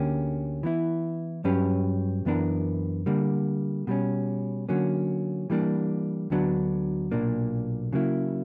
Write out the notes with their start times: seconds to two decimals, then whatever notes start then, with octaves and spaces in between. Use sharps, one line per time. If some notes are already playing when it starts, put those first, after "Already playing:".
Already playing: D2 D3 A#3 C#4 G4
0.63 E3 B3 E4
1.44 G2 F#3 C#4 G4 B4
2.25 F#2 E3 B3 D4 A#4
3.06 D3 G3 A#3
3.87 B2 G3 C#4
4.69 D3 F#3 A#3 C#4
5.50 E3 G3 A#3 D4
6.30 D2 D3 F#3 B3 D4
7.11 B1 A#2 A#3 D4
7.93 C#3 F#3 A#3 E4